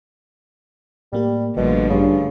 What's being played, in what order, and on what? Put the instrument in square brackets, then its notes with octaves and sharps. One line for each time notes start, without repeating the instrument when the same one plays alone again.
[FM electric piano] A2 A#3 G4 [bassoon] G3
[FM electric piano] A1 G3 A#3 [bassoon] B2 [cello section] D3 F3 A3
[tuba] G2 [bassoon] C#3